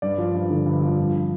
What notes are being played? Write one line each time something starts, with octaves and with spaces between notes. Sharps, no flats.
G2 D5
F3
G2
D3
G2
F3
F2